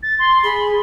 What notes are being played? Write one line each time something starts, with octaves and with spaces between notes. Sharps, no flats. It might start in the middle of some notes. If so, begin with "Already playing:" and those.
A6
C6
G#4 B5